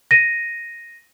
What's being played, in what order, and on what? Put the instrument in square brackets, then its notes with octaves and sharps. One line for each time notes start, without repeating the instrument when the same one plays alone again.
[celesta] A#6 D#7